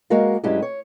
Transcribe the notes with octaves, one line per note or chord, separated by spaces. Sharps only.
G#3 A#3 F#4 A#4 F5
G2 F#3 G#3 C#4 E4 G4
C#5